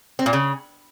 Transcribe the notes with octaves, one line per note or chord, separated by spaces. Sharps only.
C4
A#2
C#3